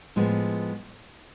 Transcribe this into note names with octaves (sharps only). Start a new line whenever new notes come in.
A2 F3 G#3 B3